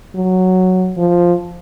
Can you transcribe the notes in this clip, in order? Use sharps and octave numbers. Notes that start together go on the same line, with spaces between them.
F#3
F3